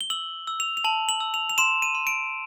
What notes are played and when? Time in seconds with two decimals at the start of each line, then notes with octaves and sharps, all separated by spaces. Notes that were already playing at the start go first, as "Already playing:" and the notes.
0.01 G7
0.10 E6 F#7
0.47 E6
0.60 F7
0.77 F7
0.84 A5 F#7
1.09 F#7
1.21 E6
1.34 F7
1.50 F7
1.58 C6 E7
1.82 D#7
1.95 C6
2.07 D7